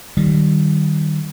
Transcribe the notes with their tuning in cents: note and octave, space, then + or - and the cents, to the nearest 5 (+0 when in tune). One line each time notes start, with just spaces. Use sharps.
D#3 -15 G3 -20